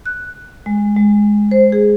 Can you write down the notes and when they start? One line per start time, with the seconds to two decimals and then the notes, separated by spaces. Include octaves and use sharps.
0.06 F#6
0.66 G#3
0.97 G#3
1.51 C5
1.72 G#4